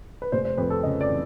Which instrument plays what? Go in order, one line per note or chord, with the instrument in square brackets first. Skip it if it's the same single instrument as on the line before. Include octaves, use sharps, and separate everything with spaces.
[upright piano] B4
F1 C5
C5
F2 B4
A4
C#3 D#5
D5
E3